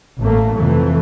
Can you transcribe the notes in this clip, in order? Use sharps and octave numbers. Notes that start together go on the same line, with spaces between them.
A1 A3 A#3
F2 C3 E3 A3